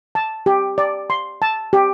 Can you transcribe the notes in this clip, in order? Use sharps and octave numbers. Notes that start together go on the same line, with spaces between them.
A5
G4
D5
C6
A5
G4